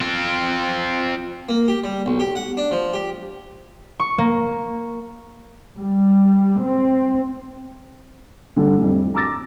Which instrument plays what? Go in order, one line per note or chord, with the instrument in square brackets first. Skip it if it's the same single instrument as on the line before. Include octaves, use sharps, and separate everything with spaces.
[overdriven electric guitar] C4 F4
[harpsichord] A#3
G4
G3
B1
G4
F#5
D4
F3
G4
[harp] C#6
A#3
[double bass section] G3
C4
[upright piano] D3 G3 A4
F2 A2 G3
A#5 D6 E6 A6 A#6